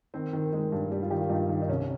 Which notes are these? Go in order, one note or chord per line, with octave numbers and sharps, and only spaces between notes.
D#3 C4
D#3
D#3 G#3
G2
G2 G3
F4
D#3 G4
F4
G2 D#4
D#3
D#4
C2 C#4